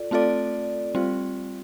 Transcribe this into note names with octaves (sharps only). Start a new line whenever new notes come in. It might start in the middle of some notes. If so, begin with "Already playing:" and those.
Already playing: F4 A4 D5
A3 C4 F4 A4 D5
G3 C4 F4